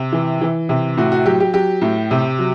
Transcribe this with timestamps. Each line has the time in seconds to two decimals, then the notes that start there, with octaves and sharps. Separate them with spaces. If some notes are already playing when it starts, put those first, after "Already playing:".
Already playing: C3
0.12 E3
0.41 E3
0.69 C3
0.97 A2 F#4
1.12 F#4
1.26 F#3 G4
1.40 G4
1.53 F#3 G4
1.82 A2
2.11 C3
2.39 F#3